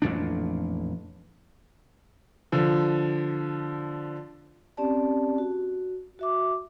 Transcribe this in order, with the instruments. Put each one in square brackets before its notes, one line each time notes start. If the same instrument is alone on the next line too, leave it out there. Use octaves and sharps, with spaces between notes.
[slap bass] A1 F2 A#2 D4
[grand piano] D3 F3
[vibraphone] C4 C#4 G4 D5 A5
F#4
F#4 E5 D6